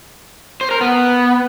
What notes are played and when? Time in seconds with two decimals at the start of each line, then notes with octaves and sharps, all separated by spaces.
0.61 C5
0.71 A#4
0.81 B3